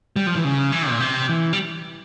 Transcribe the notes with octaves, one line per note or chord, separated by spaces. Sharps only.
G3
F3
E3
C#3
E3
A#2
C3
E3
G3